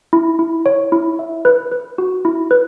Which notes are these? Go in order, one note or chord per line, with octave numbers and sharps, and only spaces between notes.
E4
E4
C#5
E4
E5
B4
B4
F#4
E4
B4